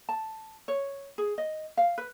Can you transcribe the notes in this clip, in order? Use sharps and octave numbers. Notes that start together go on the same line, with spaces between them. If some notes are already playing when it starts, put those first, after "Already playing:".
A5
C#5
G#4
D#5
F5
B4